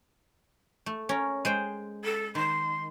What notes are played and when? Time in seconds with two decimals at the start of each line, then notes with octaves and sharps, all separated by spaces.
0.86 A3
1.09 C#4 A#4
1.45 G#3 C5 G5
2.04 A4
2.35 D#3 C6